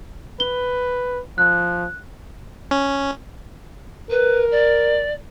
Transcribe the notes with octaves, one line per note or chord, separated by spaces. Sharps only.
B4 G7
F3 F#6
C#4
A#4 B4
D5